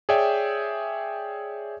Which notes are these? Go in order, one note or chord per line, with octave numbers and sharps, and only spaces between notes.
G#4 C#5 D5 E5 G5 G6